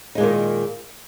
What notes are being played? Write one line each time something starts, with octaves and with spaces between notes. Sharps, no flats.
A#2 D#3 G#3 D#4